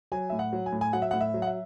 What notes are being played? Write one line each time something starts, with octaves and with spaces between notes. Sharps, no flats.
F#3 G#5
A2 E5
F#5
F#3
G#5
A2
G#5
F#3 F#5
E5
A2 F#5
E5
F#3
F#5
E5